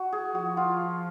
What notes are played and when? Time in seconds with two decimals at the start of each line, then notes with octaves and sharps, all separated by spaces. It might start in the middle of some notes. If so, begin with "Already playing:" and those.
Already playing: F#4
0.12 G#4
0.35 F3 F#4
0.57 F4